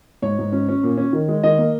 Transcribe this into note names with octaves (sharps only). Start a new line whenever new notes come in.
G#2 C#5
G#2
C#4
C#4
A#2
C#4
D#3
G#3
D#3 D#5
A#3